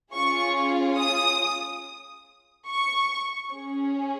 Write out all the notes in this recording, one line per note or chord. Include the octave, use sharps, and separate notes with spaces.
C#4 F4 G#4 C#6
D#6
C#6
C#4 G#4